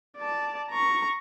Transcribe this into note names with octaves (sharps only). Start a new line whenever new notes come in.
D5 A5
A#5 C#6